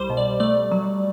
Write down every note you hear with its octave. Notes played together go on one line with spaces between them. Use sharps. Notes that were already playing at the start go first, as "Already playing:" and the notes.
Already playing: C2 G3 C5
B2
D5
A3 D5
F#3